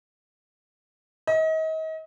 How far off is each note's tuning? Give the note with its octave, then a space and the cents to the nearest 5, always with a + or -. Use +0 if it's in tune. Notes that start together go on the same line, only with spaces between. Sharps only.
D#5 +35